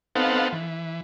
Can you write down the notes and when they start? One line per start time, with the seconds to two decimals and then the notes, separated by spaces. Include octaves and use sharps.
0.15 B3 C4 D#4 A4 F5 F#5
0.53 E3